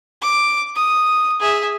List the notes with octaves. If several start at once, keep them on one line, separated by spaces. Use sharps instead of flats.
D6
D#6
G#4 E5